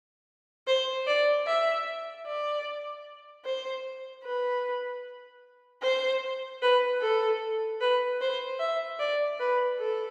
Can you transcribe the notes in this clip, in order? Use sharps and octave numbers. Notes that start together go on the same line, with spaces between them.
C5
D5
E5
D5
C5
B4
C5
B4
A4
B4
C5
E5
D5
B4
A4